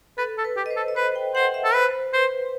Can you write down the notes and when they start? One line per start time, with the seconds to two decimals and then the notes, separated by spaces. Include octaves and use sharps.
0.18 A4 B4
0.37 A4
0.44 B4
0.56 G4
0.66 D#5
0.70 C5
0.76 A4
0.88 D#5
0.96 B4 C5
1.16 G5
1.35 C5 F#5
1.54 E5
1.64 A4
1.74 B4 C5
2.13 B4 C5